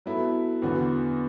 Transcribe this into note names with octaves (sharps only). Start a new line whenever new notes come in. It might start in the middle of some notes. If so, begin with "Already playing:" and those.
F#3 B3 E4 A4
E2 D3 F#3 B3 F#4